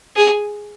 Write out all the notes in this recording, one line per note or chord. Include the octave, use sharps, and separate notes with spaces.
G#4